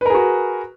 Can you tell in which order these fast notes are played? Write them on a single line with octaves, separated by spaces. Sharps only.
B4 A#4 G#4 F#4